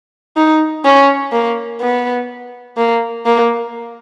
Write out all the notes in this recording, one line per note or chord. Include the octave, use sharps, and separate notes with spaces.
D#4
C#4
A#3
B3
A#3
A#3